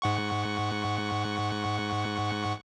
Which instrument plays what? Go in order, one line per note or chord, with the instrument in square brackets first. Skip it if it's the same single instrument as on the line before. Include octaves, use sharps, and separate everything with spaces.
[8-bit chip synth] G#2 F#5 C#6